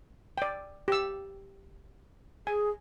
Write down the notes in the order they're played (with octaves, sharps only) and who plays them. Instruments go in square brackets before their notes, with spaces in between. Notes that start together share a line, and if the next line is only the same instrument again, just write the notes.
[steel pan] D5 G5
G4 E6
[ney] G#4 [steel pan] G#5